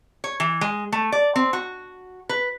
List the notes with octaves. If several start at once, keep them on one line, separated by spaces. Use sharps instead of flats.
C#5
E3
G#3
A3
D5
C4
F#4
B4